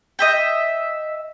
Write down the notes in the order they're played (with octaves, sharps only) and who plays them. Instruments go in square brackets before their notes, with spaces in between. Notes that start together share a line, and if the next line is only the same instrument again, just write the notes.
[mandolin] D#5 E5 G5